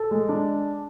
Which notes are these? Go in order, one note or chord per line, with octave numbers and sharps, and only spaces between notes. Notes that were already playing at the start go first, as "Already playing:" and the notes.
Already playing: A4
G#3
D4